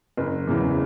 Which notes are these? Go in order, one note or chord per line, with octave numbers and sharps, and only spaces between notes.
F#1
E2 C#3 E3